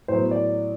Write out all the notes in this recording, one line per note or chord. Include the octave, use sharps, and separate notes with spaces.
A2 F#3 B3 C5
D5